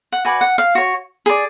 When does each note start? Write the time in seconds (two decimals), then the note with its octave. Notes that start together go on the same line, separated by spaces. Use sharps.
0.12 F#5
0.25 F#4 B4 D5 G#5
0.41 F#5
0.58 F5
0.75 F#4 C#5
1.26 G#4 D5